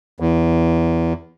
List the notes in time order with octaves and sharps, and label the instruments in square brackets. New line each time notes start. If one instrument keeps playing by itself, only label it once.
[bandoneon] E2